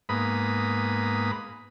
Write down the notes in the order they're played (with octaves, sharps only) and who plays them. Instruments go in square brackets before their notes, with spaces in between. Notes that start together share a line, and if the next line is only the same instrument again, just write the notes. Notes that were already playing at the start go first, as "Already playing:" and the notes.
[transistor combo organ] G#2 A#3 B3 B5 D#6